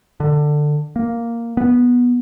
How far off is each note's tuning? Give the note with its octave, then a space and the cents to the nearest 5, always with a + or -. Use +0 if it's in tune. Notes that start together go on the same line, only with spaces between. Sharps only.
D3 +15
A#3 +0
B3 -10